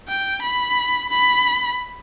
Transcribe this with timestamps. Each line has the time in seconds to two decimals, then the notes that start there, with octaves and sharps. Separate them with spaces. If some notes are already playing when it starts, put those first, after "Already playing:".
0.08 G5
0.42 B5
1.10 B5